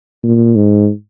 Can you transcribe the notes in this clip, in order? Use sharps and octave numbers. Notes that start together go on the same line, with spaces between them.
A#2
G#2